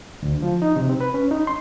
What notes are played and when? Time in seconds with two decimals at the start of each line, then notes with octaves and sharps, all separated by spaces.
0.23 D2
0.42 F3
0.62 D#4
0.76 C3
0.89 C4
1.01 B4
1.14 C#4
1.31 D#4
1.47 C6